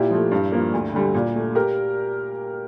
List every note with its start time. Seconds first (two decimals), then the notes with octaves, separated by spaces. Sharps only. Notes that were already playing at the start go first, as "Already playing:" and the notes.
Already playing: A#2 E4 G4
0.11 F3 A3
0.31 G2
0.52 F3 A#3
0.74 D2
0.94 D3 G3
1.15 A#2
1.36 A3
1.55 G4 A#4